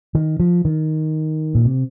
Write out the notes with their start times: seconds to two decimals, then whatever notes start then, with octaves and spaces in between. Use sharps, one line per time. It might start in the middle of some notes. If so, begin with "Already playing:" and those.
0.15 D#3
0.40 F3
0.65 D#3
1.55 A#2
1.65 C3